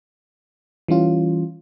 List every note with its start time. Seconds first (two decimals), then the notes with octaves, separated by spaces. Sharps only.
0.88 E3 G3 C#4 F4